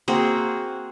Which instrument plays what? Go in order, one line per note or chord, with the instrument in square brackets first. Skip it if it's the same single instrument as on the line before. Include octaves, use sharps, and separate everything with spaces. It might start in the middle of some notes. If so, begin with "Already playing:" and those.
[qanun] A#3 C4 F#4 G#4